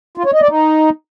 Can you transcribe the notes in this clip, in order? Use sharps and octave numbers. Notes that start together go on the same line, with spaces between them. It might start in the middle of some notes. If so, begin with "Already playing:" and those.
F4
C#5
D#5
D5
D#4